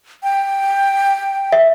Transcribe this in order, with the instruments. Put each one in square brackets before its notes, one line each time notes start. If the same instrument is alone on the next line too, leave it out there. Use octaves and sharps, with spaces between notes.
[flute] G5
[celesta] E5